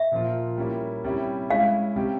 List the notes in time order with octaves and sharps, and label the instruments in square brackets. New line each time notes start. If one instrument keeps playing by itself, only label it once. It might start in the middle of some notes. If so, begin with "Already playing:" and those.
Already playing: [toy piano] E5
[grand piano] A#2 F3 A#3 F4
G3 A#3 C#4 E4
C3 G3 C#4 E4 G4
[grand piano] G#3 C#4 E4 [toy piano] F5
[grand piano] C3 G3 C#4 G4